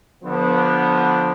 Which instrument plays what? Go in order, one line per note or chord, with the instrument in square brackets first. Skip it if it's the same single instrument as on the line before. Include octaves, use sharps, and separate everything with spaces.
[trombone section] D3 F3 B3